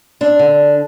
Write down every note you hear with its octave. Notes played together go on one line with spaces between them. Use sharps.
C4 D4
D3